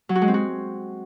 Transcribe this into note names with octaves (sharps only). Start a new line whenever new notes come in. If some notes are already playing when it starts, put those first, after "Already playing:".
F#3
F#4
G#3
C4
F#4